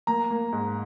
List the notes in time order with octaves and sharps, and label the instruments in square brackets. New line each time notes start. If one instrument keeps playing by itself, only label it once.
[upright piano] A#3 A#5
A#3
G#2